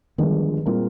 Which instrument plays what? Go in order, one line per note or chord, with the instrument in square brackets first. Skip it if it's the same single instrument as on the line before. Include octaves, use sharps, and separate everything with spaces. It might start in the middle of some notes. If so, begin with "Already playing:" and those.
[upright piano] G1 G2 F3 G#3 [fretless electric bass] D#3
[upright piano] A#2 G#3 C4 F4 A#4 [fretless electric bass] G3